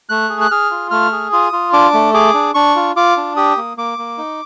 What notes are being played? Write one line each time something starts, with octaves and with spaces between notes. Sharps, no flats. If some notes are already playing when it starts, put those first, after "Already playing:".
A3 F#6
G#4
F#6
G#4 F6
F4
A3 F6
G#4
F4 D#6
F4
D4 D6
A3
G#4 D6
D4
D4 C#6
F4
F4 D6
D4
G4 D#6
A#3
A#3 D6
A#3
D#4